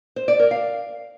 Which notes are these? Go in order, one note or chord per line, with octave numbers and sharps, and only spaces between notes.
C5
D5
A#4
F5